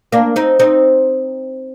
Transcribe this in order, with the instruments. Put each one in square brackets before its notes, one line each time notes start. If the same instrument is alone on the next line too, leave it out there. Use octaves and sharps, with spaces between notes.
[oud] A#3 D4
C4 D#4
C4 D#4